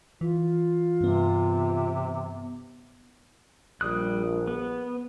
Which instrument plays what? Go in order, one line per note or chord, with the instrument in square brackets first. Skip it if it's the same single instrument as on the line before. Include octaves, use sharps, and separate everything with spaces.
[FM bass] E3 [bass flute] F4
[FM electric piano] G2 B3 [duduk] C3
[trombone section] A#1 [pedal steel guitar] G3 D#6 F#6
[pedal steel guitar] B3